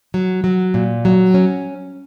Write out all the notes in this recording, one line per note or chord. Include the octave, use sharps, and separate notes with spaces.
F#3
F#3
A#2
F#3
C#4